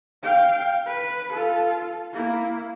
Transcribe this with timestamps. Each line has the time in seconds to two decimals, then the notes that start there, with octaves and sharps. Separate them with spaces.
0.23 F5 G5
0.86 B4
1.32 F4 A4
2.13 A#3 E4